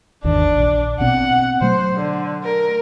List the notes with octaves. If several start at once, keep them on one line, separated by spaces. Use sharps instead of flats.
G#1 E2 D#3 D4
A#1
B2 B3 C4 F#5
B2 F#3 A3 C5
D3
A#4